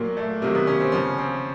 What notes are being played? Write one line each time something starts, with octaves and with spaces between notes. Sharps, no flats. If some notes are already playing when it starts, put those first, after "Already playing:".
Already playing: A#2 F#3 A#3
A3
C3 D#3 F#3 A#3
B3
C#4
C4
C#3 F3 C#4
C4